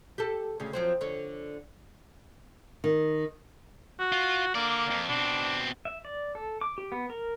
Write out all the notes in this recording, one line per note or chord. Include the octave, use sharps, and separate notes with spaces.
G4 A4
D2 C#3
F3 F#3 C4
D3 C#5
D#3
F#4
F4
D3 A#3 D5
F2
B2 C4 D4
E5
D5
A4
D6
G4
B3
A#4